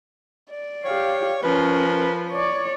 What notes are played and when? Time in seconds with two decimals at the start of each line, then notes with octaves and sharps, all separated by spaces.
0.50 D5
0.85 G4 C#5 F5
1.43 F3 C#4 A#4 B4
2.32 C#5 D5